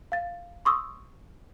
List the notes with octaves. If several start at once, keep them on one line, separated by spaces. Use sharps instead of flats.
F5 A6
C6 C#6 D#6 E6